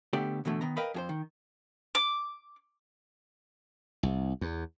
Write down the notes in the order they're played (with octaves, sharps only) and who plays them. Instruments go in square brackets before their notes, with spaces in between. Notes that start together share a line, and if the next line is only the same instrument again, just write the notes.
[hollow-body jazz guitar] D3 A3 B3 G4 A4 D5
B2 D3 E3 A3
D#3 B3 A#5
A#4 B4 D#5 F5 G5 B5
F2 G#4 C5
D#3
[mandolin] D6
[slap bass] C2
E2